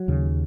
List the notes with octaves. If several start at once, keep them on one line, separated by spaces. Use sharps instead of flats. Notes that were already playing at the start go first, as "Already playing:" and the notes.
Already playing: F#3
D#2 C#3